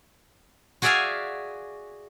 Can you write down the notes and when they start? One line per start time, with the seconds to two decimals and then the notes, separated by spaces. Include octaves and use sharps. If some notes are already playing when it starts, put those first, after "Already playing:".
0.82 F#4 G#4 D5 E5 F5 G#5